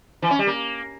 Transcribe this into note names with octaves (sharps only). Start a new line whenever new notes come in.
E3
C#4
G3
A#3